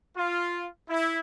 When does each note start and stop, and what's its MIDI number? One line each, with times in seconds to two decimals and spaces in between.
0.15 0.65 65
0.88 1.20 64